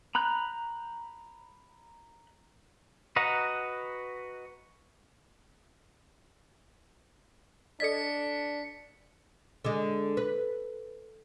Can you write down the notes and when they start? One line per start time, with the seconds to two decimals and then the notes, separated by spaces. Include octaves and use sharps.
0.15 A#5 B5 F#6 G6
3.16 F#4 B4 D#5 F#5 A#5
7.80 D4 A4 D5 D#5 B6 C#7
9.64 D3 G#3
10.17 B4